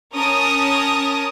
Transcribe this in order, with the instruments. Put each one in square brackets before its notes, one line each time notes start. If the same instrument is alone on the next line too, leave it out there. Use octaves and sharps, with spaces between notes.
[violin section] C#4 A#4 A5 D#6